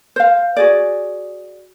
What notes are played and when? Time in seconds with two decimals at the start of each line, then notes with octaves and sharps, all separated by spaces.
0.16 C5 F5
0.57 F#4 G#4 D5